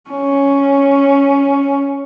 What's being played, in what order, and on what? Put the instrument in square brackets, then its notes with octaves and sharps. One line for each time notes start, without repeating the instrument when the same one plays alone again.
[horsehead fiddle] C#4